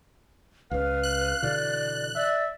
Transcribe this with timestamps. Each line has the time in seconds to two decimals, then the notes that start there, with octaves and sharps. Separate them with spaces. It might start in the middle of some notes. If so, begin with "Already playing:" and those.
0.71 C#2 C#3 B4 F5
1.03 F#6
1.43 B2 D3 E3 D5
2.15 D5 E5